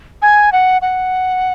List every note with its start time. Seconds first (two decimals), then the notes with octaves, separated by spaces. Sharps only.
0.22 G#5
0.52 F#5
0.82 F#5